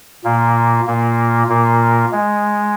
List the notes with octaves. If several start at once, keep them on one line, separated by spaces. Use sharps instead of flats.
A#2 A#3
A#2 A#3
A#2 A#3
G#3